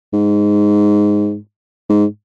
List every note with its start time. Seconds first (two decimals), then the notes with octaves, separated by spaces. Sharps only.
0.14 G#2
1.89 G#2